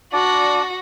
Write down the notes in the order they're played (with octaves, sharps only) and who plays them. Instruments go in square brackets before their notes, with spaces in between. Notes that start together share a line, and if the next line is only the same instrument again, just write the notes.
[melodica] D4 D5 [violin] F#4 A#6